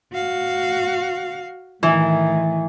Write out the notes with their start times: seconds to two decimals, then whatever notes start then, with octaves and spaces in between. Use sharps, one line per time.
0.12 F#4 F5
1.83 A2 D#3 E3